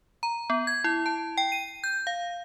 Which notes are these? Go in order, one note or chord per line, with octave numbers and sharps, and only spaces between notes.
A#5
B3
G#6
E4
A5
G5
D#7
G6
F5